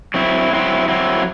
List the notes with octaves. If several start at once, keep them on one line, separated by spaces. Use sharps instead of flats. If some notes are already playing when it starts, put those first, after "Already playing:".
F#3 C4 E4
F#3 C4 E4
F#3 C4 E4